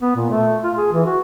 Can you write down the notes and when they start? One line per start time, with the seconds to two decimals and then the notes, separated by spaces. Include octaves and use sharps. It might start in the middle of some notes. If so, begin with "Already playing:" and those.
0.01 B3
0.16 A#2
0.31 A3
0.64 F4
0.77 G#4
0.92 E3
1.06 F#4